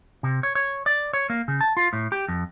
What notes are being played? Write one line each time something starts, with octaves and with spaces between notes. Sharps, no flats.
C3
C#5
C#5
D5
C#5
A#3
C#3
A5
F4
A2
G4
F2